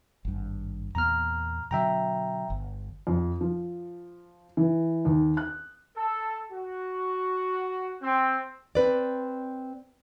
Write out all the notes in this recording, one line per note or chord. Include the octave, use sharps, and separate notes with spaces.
G#1 G2
E2 A#2 A#3 A#5 F6
B2 D3 F#3 E5 G5 A#5
G1
F2
F3
E3
D#2
F#6
A4
F#4
C4
C4 B4 D5